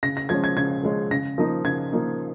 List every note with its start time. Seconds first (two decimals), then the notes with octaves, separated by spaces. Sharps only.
0.03 C#3 A#6
0.17 A#6
0.29 F3 G#3 C#4 G#6
0.44 G#6
0.56 C#3 G#6
0.83 F3 G#3 C#4
1.11 C#3 A#6
1.38 F3 A#3 D#4
1.64 C#3 G#6
1.92 F3 A#3 D#4